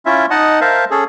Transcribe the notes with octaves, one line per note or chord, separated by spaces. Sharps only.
C#4 E4 F4 E5
D#4 D#5 F#5 A5
A#4 C5 E5 F5 A5
C#4 G#4 A4